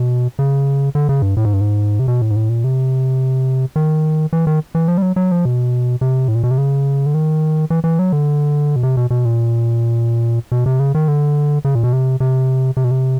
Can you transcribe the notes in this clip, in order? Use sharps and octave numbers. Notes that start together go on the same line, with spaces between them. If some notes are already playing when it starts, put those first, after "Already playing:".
Already playing: B2
C#3
D3
C#3
G2
A2
G#2
G2
G#2
C3
B2
A2
G#2
A2
A#2
C3
D#3
E3
D#3
E3
F3
G3
F#3
F#3
F3
B2
C3
A2
A#2
B2
C3
C#3
D3
D#3
E3
E3
F#3
D3
B2
C3
B2
B2
A#2
B2
C3
C#3
D#3
D3
C#3
A#2
B2
C3
C3
C3
B2
C3